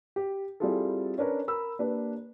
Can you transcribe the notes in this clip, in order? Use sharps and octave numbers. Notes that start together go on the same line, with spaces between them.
G4
G3 C4 E4 F4 G#4 A4
C#4 D4 A#4 B4 C#5
A#4 B5 E6
A#3 D4 G4 B4